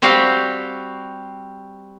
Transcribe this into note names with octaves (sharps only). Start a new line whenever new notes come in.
G3 C4 F#4 G4 F5 G5